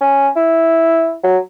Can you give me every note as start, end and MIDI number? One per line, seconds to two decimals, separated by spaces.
0.01 0.28 61
0.36 1.13 64
1.23 1.38 54